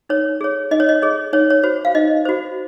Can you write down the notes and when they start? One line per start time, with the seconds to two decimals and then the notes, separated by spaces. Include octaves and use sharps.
0.09 D#4 C#5
0.41 G#4 C#5
0.71 D#4 D#5
0.80 C#5
0.89 D#5
1.02 G#4 C#5
1.33 D#4 C#5
1.50 C#5
1.63 F#4 C5
1.85 F5
1.95 D#4 D#5
2.25 F#4 C5